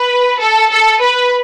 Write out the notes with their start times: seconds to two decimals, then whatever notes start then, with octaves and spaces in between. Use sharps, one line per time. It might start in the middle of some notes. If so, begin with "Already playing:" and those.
Already playing: B4
0.40 A4
0.71 A4
1.01 B4